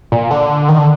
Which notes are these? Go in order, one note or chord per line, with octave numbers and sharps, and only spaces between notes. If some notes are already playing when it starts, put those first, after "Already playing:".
A#2
D3
D#3
D3